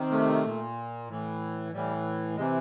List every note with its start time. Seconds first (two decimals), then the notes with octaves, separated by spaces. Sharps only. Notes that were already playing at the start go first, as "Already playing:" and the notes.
Already playing: C3 D#3
0.12 A3
0.44 A#2
1.08 A2 E3
1.72 A2 E3 G3
2.36 C3 E3 G#3